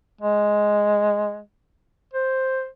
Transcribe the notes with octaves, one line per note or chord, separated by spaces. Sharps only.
G#3
C5